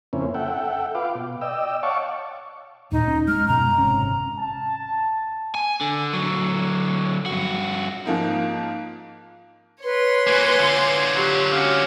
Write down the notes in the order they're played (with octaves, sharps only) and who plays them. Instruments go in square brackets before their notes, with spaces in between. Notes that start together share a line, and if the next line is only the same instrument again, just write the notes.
[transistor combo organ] F2 C#3 A#3 C4 C#4 E4
A4 E5 F#5 G5
F4 B4 F5 D6
B2
D5 D#5 G5 E6
C#5 F5 F#5 A5 C#6 D6
[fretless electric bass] D#2 A#2 [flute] D#4
[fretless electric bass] D#1 C#4
[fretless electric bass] G#3 [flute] F6
[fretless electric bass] F#2 B2 G#3 [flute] A#5
[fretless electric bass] G#1 C3 C#4
[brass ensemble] A5
[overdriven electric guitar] G#5
D3
D3 F#3
G2 F#4
[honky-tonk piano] G#2 F3 A#3 D#4
[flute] B4 [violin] C#5 C6
[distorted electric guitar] A#3 F#4 [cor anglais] G#5
[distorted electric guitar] D3 F4
[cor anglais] F#3 [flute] G4
[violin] C#4 F#4 [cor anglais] F5